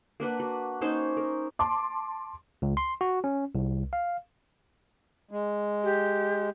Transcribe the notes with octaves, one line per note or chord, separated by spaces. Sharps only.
A#3 D4 B4 F#5
F#4 F#5
A#3 C#4 D#4 C5
A#4
A5 C6 D6
C#2
C6
F#4
C#4
C2
F5
G#3
G4